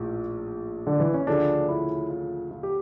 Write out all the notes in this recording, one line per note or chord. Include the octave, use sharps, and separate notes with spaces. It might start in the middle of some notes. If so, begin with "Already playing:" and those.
Already playing: A#1 A2 F3
D3
E3
C#4
D2 C#3 F3 A3 C#4 D4
E4
F4
F4
G4